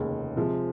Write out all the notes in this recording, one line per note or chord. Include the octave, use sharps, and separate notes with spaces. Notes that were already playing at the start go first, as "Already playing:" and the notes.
Already playing: F1 D#2 C#3 G#3
C3 F3 G#3